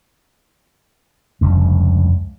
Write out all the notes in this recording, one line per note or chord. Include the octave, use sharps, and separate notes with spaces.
F1 C#2 G2